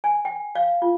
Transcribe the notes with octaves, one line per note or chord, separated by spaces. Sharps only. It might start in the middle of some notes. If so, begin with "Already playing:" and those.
G#5
G5
F5
F4